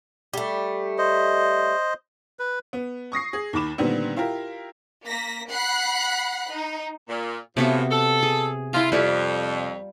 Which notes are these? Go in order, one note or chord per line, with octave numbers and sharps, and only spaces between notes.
G3 A3
C5 D#5
B4
B3
C#6 D#6 A#6 C7
G#4
D#2 D#3 B5 D6 E7
A#2 D3 D#3 G3 B3 C4
E4 F4 G4 A#4
A#3 A#6 B6
F#5 B5 F#6 C7
D#4
A#2
A2 C3 E3 F3 B3 F#4
A4
G#4
E4 F4 A#5
F2 G3 F4 G4